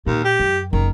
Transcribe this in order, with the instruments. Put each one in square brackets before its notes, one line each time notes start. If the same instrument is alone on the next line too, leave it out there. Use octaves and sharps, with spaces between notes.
[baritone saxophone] D#2 [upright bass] A#2
[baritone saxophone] G4
[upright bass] F#2
[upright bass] F#1 [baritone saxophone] D#3